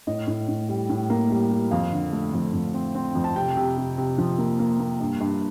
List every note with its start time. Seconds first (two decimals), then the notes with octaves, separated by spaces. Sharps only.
0.07 A2 D#5
0.27 A2
0.48 A2
0.69 G3
0.89 A2
1.10 A#3
1.31 G3
1.51 G3
1.71 F2 F5
1.92 D3
2.13 A3
2.33 F2
2.53 F2
2.74 C4
2.95 C4
3.15 F2
3.24 A5
3.35 C3 G5
3.56 C3
3.77 C3
3.98 C3
4.18 F3
4.38 A#3
4.59 A#3
4.79 A#3
5.00 G2
5.20 G2